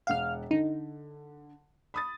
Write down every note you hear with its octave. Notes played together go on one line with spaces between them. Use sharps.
E1 F5 F#5 F6
D3 D#4
B5 D#6 A6